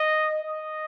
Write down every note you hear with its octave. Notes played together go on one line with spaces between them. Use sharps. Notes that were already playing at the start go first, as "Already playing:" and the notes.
Already playing: D#5
D#5